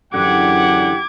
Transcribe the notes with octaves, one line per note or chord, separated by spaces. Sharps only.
F#2 D3 E3 D4 G4 F#5 D6 G#6